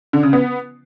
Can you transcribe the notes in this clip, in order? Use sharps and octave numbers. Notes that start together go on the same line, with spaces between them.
D3
C#3
B3